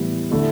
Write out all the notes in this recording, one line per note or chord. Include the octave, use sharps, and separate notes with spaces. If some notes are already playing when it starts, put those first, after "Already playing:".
Already playing: A2 E3 G3 B3
D3 A3 E4